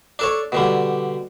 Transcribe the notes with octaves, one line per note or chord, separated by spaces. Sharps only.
D4 A4 C#5
B2 D3 G3